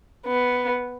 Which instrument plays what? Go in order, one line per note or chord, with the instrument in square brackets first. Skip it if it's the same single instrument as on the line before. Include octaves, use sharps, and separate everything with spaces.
[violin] B3